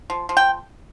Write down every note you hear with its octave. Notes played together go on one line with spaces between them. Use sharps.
F3
F3
G5